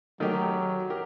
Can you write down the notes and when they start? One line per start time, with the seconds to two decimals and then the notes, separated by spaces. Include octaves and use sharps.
0.20 D#3 F#3 A3 D#4 G4 A#4
0.90 G4 A#4